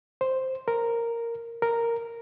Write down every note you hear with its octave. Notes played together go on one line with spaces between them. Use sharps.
C5
A#4
A#4